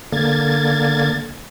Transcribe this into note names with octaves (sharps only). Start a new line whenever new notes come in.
D3 A#3 G#6 A6